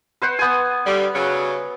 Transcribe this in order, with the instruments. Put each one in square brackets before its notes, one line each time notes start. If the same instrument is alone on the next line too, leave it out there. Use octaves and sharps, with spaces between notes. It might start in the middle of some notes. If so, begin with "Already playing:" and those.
[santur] B4 C5 F#5
B3 G#5
[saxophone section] D3 G3
C#3 F#3